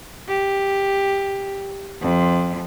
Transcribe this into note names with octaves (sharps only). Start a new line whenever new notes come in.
G4
F2